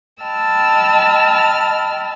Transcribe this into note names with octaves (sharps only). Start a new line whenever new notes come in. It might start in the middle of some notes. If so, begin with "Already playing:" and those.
D#5 G5 A5 B5 E6 F6